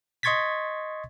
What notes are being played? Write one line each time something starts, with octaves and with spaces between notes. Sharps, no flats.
D#5 C6 C#6 G#6 A6 B6